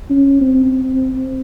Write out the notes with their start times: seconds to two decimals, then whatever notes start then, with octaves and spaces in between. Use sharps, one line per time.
0.10 C#4
0.41 C4